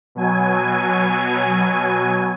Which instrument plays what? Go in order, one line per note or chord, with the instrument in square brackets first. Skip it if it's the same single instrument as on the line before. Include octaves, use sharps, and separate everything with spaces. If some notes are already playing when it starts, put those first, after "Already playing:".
[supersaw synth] B2 F#3 G#5